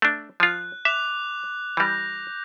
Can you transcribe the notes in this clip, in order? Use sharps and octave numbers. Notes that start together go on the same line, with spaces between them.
A3 D4
F3 F4 F#6
E5 D6 F#6 F7
E3 G3 G6 A#6